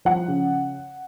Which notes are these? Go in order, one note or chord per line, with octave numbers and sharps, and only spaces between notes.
F3 F#5
C#3